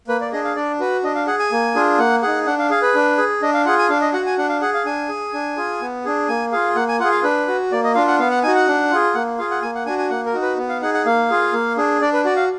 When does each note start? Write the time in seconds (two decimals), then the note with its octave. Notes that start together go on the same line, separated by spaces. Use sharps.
0.08 A#3 B4
0.21 D5
0.32 D4 G#4 D#5
0.45 F5
0.55 D4 D5
0.80 F#4 B4
1.03 D4 D#5
1.15 F5
1.27 G#4 F#5
1.39 G#5
1.52 A#3
1.75 D4 F4 G#4
1.99 A#3 F#5
2.22 D#4 G#4 F#5
2.46 D4 F#5
2.59 F5
2.71 G#4 F5
2.82 B4
2.95 D4
3.18 G#4
3.42 D4 D#5
3.54 F5
3.66 F4 G#4 F#5
3.78 G#5
3.89 D4 F5
4.01 D#5
4.13 F#4 F#5
4.26 G#5
4.38 D4 F#5
4.49 F5
4.62 G#4 F#5
4.74 F5
4.85 D4 G#5
5.09 G#4
5.33 D4
5.57 F4 G#4
5.81 B3
6.05 D4 G#4
6.28 A#3 G#5
6.52 F4 G#4 F5
6.76 A#3 F#5
6.88 G#5
7.00 F4 F#5
7.04 G#4
7.11 F5
7.23 D4 B4
7.48 F#4
7.72 A#3 D5
7.84 D#5
7.95 D4 F4 F5
8.08 F#5
8.19 B3 F5
8.31 F#5
8.43 D#4 F#4 G#5
8.55 F#5
8.67 D4
8.91 F4 G#4
9.14 A#3 F#5
9.38 F4 G#4 F5
9.51 F#5
9.62 A#3 G#5
9.75 F#5
9.86 D4 F#4 G#5
9.99 G#5
10.10 A#3 F#5
10.26 A#4
10.34 D#4 F#4
10.42 B4
10.58 B3
10.69 F5
10.81 D#4 G#4 F#5
10.94 F#5
11.06 A#3 F5
11.30 F4 G#4
11.53 A#3
11.77 D4 G#4
12.01 D4 D5
12.13 B4
12.25 F#4 D5
12.36 F5